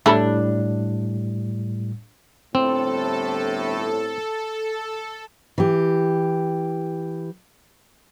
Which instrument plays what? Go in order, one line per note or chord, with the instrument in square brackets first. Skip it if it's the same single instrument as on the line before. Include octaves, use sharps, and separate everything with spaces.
[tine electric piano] A2 G3 [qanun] D4 [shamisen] E4 A4 B5
[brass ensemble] G1 A2 [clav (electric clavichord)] C4 [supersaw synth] A4
[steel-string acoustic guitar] E3 G4